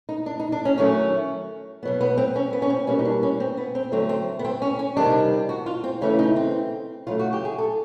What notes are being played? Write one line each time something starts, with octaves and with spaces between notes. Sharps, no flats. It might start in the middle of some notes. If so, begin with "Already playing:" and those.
D#4
D4
D#4
D4
C#4
D#3 F#3 A3 C#4
B2 F#3 B3
B3
C4
C#4
B3
C#4
C4
B2 G3 A#3 C#4
D#4
D4
C#4
C4
B3
C4
D3 F#3 A3 C4
C4
B3
C4
C#4
C#4
C3 D#3 G3 D4
F#4
F4
C4
C#3 E3 A3 C#4
D#4
C4
C#3 F#3 A3 F4
F#4
G4
G#4
A4